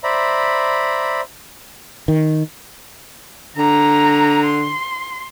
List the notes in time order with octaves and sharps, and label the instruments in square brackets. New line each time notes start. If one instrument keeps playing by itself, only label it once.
[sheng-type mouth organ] C5 D5 E5 A#5 B5
[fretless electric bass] D#3
[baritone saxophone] D3 [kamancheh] A#5
[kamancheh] C6